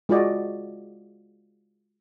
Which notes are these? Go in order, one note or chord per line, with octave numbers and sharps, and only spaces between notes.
G#3 F4 F#4 D5 D#5